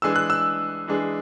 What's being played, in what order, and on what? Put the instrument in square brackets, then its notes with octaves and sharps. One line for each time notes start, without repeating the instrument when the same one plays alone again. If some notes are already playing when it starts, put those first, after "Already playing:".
[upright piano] E3 G#3 D4 G#4 [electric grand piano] E6
[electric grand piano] F#6
E6
[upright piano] E3 G#3 D4 G#4